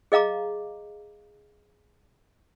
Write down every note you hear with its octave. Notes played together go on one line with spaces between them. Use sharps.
G#4 D#5 F5 A#5 D6